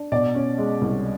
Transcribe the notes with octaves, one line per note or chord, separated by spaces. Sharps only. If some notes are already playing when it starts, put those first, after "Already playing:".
Already playing: D4
B2 D5
C#4
G#3
C2